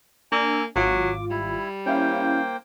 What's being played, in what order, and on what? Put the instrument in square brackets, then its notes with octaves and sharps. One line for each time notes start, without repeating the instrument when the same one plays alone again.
[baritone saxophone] A#3 [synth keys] D4 E6 [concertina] G#5
[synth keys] G#1 F4 [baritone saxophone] F#3 [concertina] D6
[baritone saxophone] G3 [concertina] E4
[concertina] A#3 C5 G5 [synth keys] C#4 E4 F5